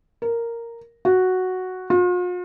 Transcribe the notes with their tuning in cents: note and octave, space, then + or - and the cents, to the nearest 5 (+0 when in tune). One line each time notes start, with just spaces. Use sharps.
A#4 -5
F#4 +0
F4 +45